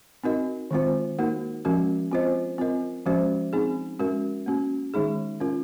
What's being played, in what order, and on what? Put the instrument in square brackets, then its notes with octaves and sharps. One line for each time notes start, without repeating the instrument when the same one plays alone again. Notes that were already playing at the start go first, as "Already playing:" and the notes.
[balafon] C4 D#4 F#4 A#4 D#5
D#3 G#3 C4 F4 C5
A#3 D#4 F#4 A#4
F3 G#3 C#4 F#4 A#4
C4 F4 C5 D#5
C4 F4 A#4 D#5
F3 G#3 C#4 F#4 C5
C4 D#4 G#4
G#3 C#4 F#4 A#4
A#3 C#4 F#4
D#3 G#3 D#4 G#4
C#4 F4 A#4